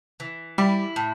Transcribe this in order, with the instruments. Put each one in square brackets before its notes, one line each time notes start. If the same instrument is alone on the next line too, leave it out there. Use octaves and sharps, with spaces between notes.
[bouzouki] E3
[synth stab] G3 [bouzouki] E4
[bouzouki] A2